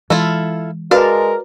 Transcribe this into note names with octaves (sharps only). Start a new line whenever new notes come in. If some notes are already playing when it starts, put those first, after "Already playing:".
E3 G#3 E4 F4 A4
G#3 F#4 A#4 B4 D5 F5 A5